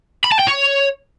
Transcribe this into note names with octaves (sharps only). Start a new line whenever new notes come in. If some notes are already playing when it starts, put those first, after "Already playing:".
B5
A5
G5
C#5